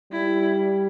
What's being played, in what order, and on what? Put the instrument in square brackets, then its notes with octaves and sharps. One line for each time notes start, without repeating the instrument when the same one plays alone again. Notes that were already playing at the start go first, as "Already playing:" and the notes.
[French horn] G3 [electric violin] E4